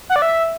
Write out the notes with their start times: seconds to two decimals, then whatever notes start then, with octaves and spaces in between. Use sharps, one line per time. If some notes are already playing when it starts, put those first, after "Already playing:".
0.09 F#5
0.16 D5
0.22 E5